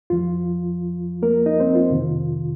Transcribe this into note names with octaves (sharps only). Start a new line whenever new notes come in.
F2 F3 F4
A#3 A#4
D#4 D#5
C4 C5
F4
F2 C3 D#3